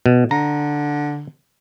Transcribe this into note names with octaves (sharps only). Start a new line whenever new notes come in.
B2
D3 A#5